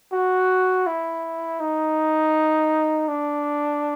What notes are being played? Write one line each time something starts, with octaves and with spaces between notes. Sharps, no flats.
F#4
E4
D#4
D4